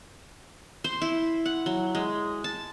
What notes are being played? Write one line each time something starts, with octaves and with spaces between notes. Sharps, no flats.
C5
E4
F#5
F#3
G#3
A5